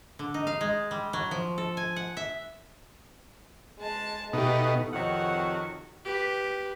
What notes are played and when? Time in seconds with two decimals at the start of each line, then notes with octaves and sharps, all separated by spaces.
0.19 D3
0.34 D#4
0.47 F5
0.61 G#3
0.91 G3
1.13 F#3
1.31 F3
1.58 A4
1.77 G#5
1.96 F#5
2.17 E5
3.79 G#3 A5
4.33 B2 A3 D#4 G4
4.93 F2 C3 D#3 F#4 C#5 F#5
6.05 G4 B4